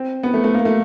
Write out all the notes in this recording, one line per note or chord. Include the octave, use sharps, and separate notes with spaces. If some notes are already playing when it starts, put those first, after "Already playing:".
Already playing: C4
B3
A3
A3
A#3
A3